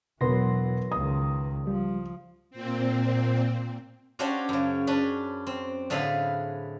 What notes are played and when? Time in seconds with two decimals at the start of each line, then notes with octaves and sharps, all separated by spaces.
0.21 E1 E3 F#3 B3 B4 C6 A#6
0.92 C#2 D#3 D#6
1.67 F3 G3
2.50 A#2 C4
4.19 C#4 D4 F#4 G4 C5 C#5
4.49 F#2 C#3
4.87 C#4 D4 B4
5.47 C4
5.90 A2 D3 G#4 B4 F5